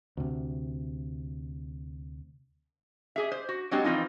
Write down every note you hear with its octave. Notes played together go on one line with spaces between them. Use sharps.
D2 C3
G4 G#4 E5
C5
F#4
F#3 G#3 C4 D4 F#4 G4
E3 F3 C4 D#4 F4